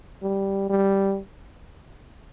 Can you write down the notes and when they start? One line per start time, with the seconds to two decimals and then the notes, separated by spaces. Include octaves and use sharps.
0.22 G3
0.69 G3